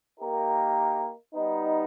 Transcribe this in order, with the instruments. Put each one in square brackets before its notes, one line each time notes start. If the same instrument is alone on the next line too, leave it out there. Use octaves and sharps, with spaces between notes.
[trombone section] A#3 D#4 G4 A#4
G3 B3 D#4